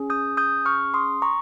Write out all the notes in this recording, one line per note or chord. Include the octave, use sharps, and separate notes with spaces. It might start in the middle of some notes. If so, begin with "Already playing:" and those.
Already playing: C#4 G#4
D#6 G6
D#6 G6
C#6 F6
C6 D#6
A#5 C#6